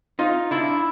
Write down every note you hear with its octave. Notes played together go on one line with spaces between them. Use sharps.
D#4 F4
D4 E4